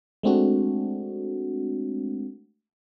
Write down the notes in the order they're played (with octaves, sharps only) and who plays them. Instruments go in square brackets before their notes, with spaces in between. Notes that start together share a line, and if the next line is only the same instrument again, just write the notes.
[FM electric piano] G#3 A3 C4 D4 F#4